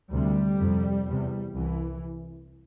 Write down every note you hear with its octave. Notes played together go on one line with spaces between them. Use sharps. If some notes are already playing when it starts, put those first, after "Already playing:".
D2 C3 G3
F2 C3
E2 C3
C2 E3